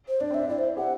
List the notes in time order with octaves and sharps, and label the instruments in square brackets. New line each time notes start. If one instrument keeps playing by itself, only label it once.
[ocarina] C5
[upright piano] D4 [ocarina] D5
[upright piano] C4
[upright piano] D4 [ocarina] E5
[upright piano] E4 [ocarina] D5
[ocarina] C5
[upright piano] G4 [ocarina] F#5